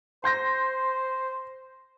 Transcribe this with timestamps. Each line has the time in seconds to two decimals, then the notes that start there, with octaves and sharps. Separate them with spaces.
0.24 C5 C6 G6 A#6